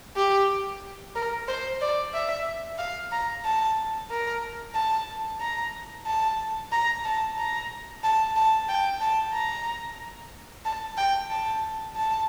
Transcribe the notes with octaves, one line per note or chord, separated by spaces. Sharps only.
G4
A#4
C5
D5
E5
F5
A#5
A5
A#4
A5
A#5
A5
A#5
A5
A#5
A5
A5
G5
A5
A#5
A5
G5
A5
A5